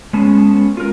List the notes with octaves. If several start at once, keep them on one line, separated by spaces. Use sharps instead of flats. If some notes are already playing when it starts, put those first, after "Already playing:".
G#3 B3 C#4 G#4 A5
F4 A#4